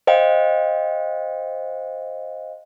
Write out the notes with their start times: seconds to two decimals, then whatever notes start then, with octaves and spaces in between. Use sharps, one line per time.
0.07 C5 D#5 F5 G5